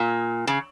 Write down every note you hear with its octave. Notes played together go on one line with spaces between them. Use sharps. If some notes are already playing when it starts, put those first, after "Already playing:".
Already playing: A#2
C#3